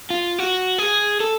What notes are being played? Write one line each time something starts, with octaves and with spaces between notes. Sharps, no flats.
F4
F#4
G#4
A4